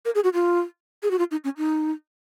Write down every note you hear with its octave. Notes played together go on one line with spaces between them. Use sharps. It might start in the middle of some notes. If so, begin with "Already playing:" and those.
A#4
G#4
F#4
F4
G#4
F#4
F4
D#4
C#4
D#4